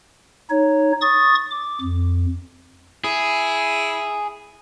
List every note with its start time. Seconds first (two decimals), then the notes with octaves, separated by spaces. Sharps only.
0.50 D#4 C#5
1.01 C#6 D#6 A6
1.50 D6
1.81 F2
3.04 E4 G#4